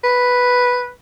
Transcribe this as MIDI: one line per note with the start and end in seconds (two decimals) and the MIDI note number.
0.04 0.90 71